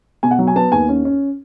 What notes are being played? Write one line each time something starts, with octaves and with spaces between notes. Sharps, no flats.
B2 G#5
F#5
F#3
G#5
B3 A5
D#2 G#5
C#4
C#4